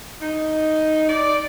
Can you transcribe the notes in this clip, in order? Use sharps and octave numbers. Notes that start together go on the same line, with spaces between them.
D#4
D5